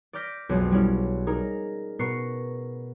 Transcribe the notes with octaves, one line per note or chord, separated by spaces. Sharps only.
D5 D6 F6 G6 A#6 B6
B1 F2 G#3
G3 C#4 E4 F6
D#4 G#4 A#4
B2 B3 A#4 C#6 C7